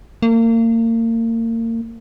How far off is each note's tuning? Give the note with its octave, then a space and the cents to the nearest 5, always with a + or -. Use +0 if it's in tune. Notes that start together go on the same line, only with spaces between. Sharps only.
A#3 -35